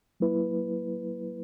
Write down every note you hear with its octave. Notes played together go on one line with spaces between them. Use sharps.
F#3 A#3 E4 B4